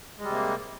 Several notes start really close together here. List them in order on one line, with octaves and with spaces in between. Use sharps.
G#3 G3 C3 A#3